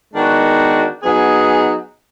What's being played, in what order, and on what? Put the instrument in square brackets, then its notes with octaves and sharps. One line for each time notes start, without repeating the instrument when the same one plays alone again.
[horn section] D#3 G#3 B3 D4 F#4
F#3 B3 D#4 G#4